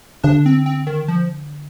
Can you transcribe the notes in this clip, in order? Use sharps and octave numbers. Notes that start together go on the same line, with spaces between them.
D3 D4
C4
C4
D#3
F3